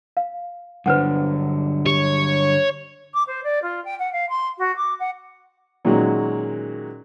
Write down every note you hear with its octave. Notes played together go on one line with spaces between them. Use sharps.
F5
G2 D3 F#3 B4 C5 F#5
G4 C#5
D6
C5
D5
F4
G5
F#5
F5
C6
F#4
D6
F#5
A#2 D#3 F#3 G#3 C#4 F#4